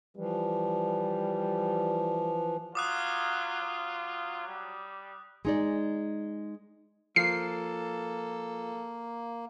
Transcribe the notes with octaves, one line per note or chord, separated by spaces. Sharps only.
E3 F3 G3
F#3 F4 D6 D#6 F#6
F#3
G3
G#3 D#4 D5
F3 A#3 A4 C7